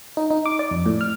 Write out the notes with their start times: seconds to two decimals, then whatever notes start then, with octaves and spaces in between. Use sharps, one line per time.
0.17 D#4
0.31 D#4
0.46 D6
0.59 D5
0.71 F2
0.86 A2
1.01 F6